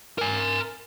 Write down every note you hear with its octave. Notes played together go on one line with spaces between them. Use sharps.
A#4 G#5